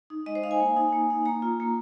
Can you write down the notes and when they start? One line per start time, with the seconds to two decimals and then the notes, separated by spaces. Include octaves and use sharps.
0.10 D#4
0.26 G#3 D#5
0.35 C5
0.43 D#4 F5
0.51 G#5
0.60 A#3
0.76 D#4
0.93 A#3
1.10 D#4
1.25 A#3 A#5
1.42 F4
1.60 A#3